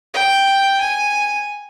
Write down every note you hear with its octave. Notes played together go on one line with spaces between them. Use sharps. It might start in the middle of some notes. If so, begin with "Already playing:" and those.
G5
G#5